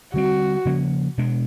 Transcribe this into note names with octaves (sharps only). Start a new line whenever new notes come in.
D3 G3 C4 F#4
C#3 F3 A#3 C#4
B2 G#3 B3 D4